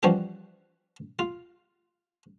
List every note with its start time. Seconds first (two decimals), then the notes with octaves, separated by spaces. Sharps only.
0.03 E3 F3 G3 C#4 F#4 G4
1.19 F4